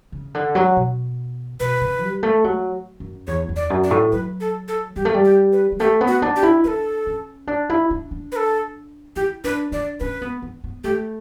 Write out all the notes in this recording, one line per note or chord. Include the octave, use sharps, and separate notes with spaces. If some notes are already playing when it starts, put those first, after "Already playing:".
C#3
D3
F#3
B2
B2 B4
C#3
G3
A3
F#3
F#2
E2 C#5
E2
D5
F#2
D5
A2
F#3 B4
A4
A4
G3 G4
A3
G3
G4
B4
G3
A3 G4
B3
F#4
D4
G4
E4
D4 A4 B4
C#4
D4
E4
D4
D4
B4
A4
E4 G4
D4 B4
D4 D5
C#4 B4
B3
B3
B3
A3 G4